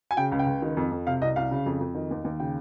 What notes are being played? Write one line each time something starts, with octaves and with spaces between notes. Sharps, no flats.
G#5
C#3 G5
C#2
G5
C#2
D#3
F2
F2
C3 F5
C2 D#5
C2 F5
C#3
F2
F2
D#3
D#2
D#2
C#3 G5